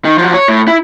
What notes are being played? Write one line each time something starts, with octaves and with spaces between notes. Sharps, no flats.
D#3
F3 F#3
C#5
A2
E4